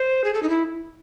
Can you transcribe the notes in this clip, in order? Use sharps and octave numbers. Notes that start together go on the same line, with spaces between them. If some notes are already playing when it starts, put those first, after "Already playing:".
Already playing: C5
G#4
A4
D#4
E4